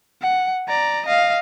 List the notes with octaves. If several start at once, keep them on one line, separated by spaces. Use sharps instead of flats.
F#5
D5 A#5
D#5 F5